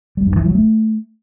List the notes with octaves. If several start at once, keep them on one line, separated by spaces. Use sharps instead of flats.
G3
G2
E3
F#3
A3